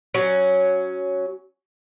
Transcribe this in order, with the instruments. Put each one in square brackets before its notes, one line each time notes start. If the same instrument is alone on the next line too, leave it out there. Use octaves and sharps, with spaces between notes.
[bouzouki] F#3 C#4